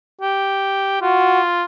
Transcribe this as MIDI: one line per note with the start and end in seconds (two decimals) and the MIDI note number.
0.21 1.01 67
1.01 1.64 65
1.01 1.40 66